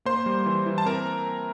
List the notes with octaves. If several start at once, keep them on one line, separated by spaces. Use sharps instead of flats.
A#3 C5 C6
G3
E3
E3
A5
C4 A#4 A#5